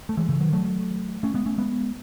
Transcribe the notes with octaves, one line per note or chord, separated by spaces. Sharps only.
A3
E3 G#3
C#3 E3
D#3 F#3
F#3 A3
A3 C#4
G#3 B3
A3 C#4
G#3 B3